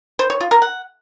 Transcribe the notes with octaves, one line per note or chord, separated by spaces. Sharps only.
C5
C#5
F4
A#4
F#5